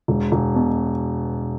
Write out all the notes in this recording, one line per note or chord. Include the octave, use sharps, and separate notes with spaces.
E1
E1
B2